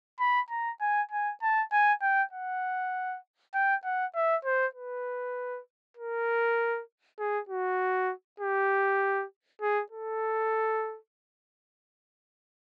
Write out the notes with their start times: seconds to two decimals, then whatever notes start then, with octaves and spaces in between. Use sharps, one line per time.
0.20 B5
0.50 A#5
0.81 G#5
1.11 G#5
1.42 A5
1.72 G#5
2.02 G5
2.33 F#5
3.54 G5
3.85 F#5
4.15 E5
4.45 C5
4.75 B4
5.97 A#4
7.19 G#4
7.49 F#4
8.40 G4
9.62 G#4
9.92 A4